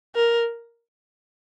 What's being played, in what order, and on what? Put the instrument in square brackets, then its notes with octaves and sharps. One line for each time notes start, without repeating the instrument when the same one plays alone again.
[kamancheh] A#4